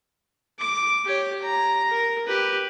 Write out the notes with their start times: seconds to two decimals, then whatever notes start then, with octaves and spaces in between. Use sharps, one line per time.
0.59 D6
1.05 G4 C#5
1.43 A#5
1.91 A#4
2.27 G4 B4